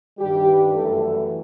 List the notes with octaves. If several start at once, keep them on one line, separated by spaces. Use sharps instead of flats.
G2 D#3 G3 G4
B4
F#2 E3 A3 A4
B4